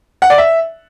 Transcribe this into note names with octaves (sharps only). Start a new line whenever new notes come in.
F#5
D5
E5